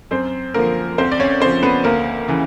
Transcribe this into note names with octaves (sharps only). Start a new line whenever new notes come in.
F#2 C4 C5
D3 F3 A#3 A#4
D2 C4 C5
D5
C#4 C#5
C#3 F3 C4 C5
B3 B4
D2 A#3 A#4
C#3 E3